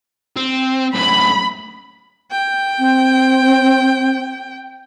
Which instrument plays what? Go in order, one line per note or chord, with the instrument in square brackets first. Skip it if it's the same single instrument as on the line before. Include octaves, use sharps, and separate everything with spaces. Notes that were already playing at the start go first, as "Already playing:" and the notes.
[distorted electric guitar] C4
[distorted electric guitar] F#2 A2 [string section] B5
[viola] G5
[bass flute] C4